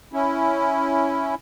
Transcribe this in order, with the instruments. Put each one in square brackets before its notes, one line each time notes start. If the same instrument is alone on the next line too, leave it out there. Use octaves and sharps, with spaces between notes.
[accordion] C#4 E4